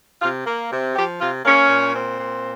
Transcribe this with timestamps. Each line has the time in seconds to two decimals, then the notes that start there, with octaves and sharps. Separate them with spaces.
0.21 C3 F4
0.46 A#3
0.71 C3
0.95 F3 G4
1.19 C3 F4
1.44 A#3 C#4
1.69 A#2
1.94 C4
2.19 A#2